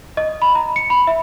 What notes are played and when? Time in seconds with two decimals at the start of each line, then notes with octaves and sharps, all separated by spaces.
0.17 D#5
0.42 B5
0.55 A#5
0.76 C#7
0.90 B5
1.07 E5